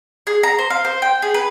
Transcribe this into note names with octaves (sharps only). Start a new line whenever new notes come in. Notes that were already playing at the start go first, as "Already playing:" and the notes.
G#4
A#5
C5
F5
C5
G5
G#4
B4